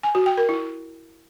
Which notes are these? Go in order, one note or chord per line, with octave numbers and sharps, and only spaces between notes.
G#5
F#4
G5
A#4
E4